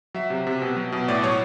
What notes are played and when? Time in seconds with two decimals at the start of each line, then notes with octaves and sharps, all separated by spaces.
0.14 F#3 E5
0.30 C3
0.47 C3
0.62 B2
0.76 F#3
0.92 B2
1.08 A2 D5
1.24 F#3 C#5